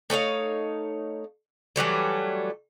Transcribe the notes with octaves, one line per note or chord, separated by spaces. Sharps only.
A3 D#4 C#5 F5
E3 F#3 G3 A3